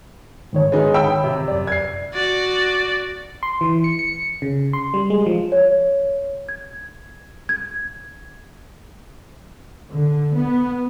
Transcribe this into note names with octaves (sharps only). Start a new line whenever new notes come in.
G#2 D#3 C#5
G#3 B3 D#4
G5 B5 E6
C3
F#2 D5
G#6 C7
F#4 D5
C6
E3
C#7
C#7
C#3
C6
G3
G#3
F3
C#5
G#6
G#6
D3
B3